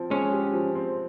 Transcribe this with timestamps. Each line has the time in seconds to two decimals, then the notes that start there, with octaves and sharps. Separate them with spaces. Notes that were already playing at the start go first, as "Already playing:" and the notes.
Already playing: F3 C4
0.10 G#3 C#4
0.33 G4
0.54 F3
0.75 C4